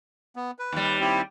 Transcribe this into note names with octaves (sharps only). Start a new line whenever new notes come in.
B3
B4
D#2 G3
C4 E4 G4